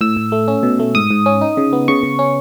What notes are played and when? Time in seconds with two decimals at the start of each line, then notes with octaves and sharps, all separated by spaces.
0.01 A2 E6
0.17 A2
0.32 A3
0.48 C#4
0.63 B2
0.80 A3
0.95 G#2 D#6
1.11 G#2
1.26 C#4
1.41 D#4
1.57 C#3
1.73 B3
1.88 C#3 C#6
2.03 C#3
2.19 C#4